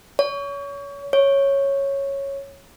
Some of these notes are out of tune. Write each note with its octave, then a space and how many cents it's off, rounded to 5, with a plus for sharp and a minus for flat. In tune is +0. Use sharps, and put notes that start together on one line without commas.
C#5 +30
C#5 -5